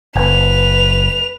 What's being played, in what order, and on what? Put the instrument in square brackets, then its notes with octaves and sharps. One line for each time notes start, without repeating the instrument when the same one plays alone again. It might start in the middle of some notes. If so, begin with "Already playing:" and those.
[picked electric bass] F#1 [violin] B4 F7